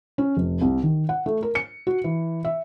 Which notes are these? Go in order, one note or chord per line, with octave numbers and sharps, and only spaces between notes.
C#4
F1
C2
D#3
F#5
A3
A#4
C#7
F#4
E3
E5